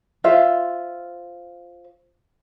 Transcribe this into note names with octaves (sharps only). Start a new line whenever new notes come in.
F4 C5 E5